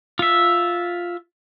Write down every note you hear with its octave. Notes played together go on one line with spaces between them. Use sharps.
F4 E5